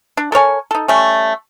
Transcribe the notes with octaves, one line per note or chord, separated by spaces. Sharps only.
D4
A4 A#4 C#5 G#5
D#4 A4
G3 A3 C#4